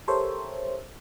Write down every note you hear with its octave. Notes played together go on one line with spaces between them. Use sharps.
G4 A4 A#4 C5 C#5 E5